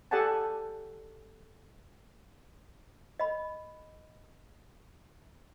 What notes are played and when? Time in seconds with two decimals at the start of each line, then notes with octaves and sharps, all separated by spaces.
0.11 G4 A4 D5 F#5 G#5 A5
3.20 D#5 B5